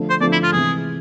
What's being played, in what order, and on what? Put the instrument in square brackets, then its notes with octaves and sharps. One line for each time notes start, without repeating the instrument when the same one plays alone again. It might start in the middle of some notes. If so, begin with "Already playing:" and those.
Already playing: [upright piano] D3 F3 A3
[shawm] C5
[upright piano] D3 F3 A3 [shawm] D5
[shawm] E4
F4
[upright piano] C3 E3 G#3 [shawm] G#4